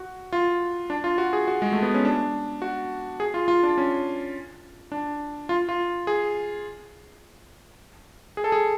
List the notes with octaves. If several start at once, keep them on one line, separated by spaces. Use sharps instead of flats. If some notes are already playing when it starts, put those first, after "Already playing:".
Already playing: F#4
F4
D4
F4
F#4
G#4
F#4
G#3
A3
B3
C#4
D4
F#4
G#4
F4
F4
D4
C#4
D4
F4
F4
G#4
G#4
A4
G#4